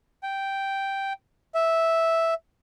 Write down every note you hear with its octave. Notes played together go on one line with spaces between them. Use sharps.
G5
E5